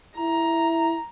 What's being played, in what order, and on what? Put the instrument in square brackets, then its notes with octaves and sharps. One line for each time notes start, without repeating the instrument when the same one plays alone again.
[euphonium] E4 [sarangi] A#5